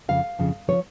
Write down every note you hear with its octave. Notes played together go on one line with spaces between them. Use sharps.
F2 C#3 F3 F5
F2 C#3 F3
C#3 F3 C#5